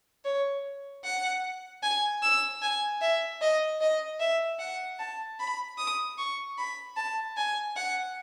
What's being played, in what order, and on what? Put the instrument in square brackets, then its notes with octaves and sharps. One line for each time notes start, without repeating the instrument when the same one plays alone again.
[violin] C#5
F#5
G#5
E6
G#5
E5
D#5
D#5
E5
F#5
A5
B5
D#6
C#6
B5
A5
G#5
F#5